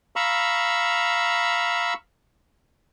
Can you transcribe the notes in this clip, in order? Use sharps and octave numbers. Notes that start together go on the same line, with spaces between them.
F5 A#5 B5 C#6 E6